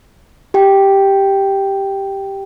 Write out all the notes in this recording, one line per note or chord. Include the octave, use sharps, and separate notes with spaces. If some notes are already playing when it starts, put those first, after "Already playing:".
G4 G5